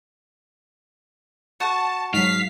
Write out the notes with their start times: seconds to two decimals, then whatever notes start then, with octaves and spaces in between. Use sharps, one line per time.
1.60 F#4 A5
2.14 G#2 F#3 F5 B6 C7